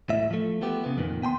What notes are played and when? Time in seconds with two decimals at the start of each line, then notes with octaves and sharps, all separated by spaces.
0.09 A2 E5
0.31 F3 A3
0.61 F3 A3 B3 G4
0.84 C#3 B3
0.97 F2 A#2 D#3
1.22 B3 G5 G#5 C6